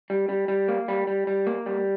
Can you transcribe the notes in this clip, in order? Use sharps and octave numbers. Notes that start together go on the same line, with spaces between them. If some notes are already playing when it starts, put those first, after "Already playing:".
G3
G3
G3
A#3
G3
G3
G3
A#3
G3